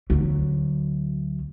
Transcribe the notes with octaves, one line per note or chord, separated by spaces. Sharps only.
D2 F#3